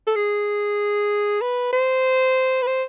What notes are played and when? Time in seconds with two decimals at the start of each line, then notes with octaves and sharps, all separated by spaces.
0.07 A4
0.16 G#4
1.41 B4
1.73 C5
2.62 B4
2.67 C5